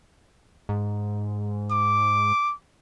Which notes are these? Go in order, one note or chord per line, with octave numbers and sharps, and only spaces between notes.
G#2
D6